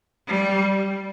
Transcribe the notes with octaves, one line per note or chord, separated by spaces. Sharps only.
G3